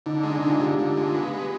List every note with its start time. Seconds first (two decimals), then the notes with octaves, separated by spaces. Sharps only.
0.06 D3 D#4
0.23 G#3
0.30 D4
0.40 D3 D#4
0.50 F4
0.60 D3 G4
0.72 G4
0.78 D3 F4
0.97 G#3 F4
1.15 B3 G4
1.33 G#3